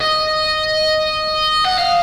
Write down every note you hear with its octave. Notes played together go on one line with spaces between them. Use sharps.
D#5
F#5
F5